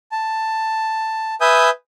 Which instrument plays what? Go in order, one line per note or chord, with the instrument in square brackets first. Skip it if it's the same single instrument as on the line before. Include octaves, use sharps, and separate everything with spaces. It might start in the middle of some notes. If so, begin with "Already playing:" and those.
[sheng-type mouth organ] A5
B4 E5 G#5 D#6 G6